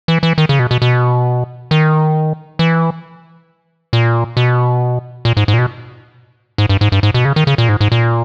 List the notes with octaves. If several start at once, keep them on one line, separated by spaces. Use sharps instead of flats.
E3
E3
D#3
C#3
B2
B2
B2
D#3
E3
A#2
B2
A#2
G#2
G#2
A#2
B2
G#2
G2
G#2
G2
G#2
B2
C#3
D#3
C#3
A#2
G#2
G#2
A#2